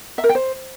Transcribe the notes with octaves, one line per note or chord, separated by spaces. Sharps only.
E5
A#4
G5
C5